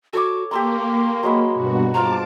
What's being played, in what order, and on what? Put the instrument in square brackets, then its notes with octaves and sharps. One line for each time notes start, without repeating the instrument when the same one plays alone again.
[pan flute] F#4 [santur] A4 C#5 D6
[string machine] A#3 [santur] G4 A4 A#5 [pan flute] C6
[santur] F#3 G#3 B5
[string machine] G2 B2 F#4
[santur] F4 C5 [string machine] A5 D6 [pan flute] A#5